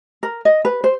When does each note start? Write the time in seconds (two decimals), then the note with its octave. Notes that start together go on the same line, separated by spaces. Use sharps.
0.23 A#4
0.45 D#5
0.65 B4
0.84 C5